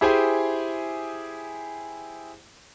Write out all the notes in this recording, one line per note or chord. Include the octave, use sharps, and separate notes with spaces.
E4 G4 G#4 C5 G5 G#5